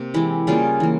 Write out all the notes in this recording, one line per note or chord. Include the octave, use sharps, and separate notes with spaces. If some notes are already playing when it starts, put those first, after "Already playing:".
Already playing: C3 A#3
E3 G#3 E4 G4
C#3 G3 A#3 F4 G#4
E3 A#3